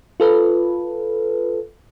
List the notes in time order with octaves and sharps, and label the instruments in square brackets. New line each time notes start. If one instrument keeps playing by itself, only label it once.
[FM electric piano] F4 A4 B4